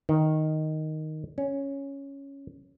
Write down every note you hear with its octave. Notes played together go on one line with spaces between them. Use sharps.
D#3
C#4